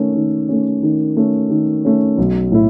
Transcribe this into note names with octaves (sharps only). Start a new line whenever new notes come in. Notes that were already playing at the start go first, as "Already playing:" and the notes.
Already playing: D#3 A3 C#4
D#3
A3 C#4
D#3
A3 C#4
D#3
A3 C#4
B1
A2 F#3 A3 E4